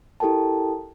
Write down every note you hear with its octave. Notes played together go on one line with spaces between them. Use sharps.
E4 G4 A4 A#4 G5 A5